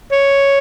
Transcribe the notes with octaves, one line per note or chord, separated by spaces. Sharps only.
C#5